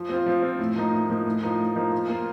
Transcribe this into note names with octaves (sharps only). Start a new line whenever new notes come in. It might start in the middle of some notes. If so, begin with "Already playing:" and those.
Already playing: F3
C4 F4
F3
C4 F4
A2
F3 A#3 D#4
A2
F3 A#3 D#4
A2
F3 A#3 D#4
A2
F3 A#3 D#4
F3
A#3 F4